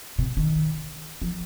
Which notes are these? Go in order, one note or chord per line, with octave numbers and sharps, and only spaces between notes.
C3
D#3
F3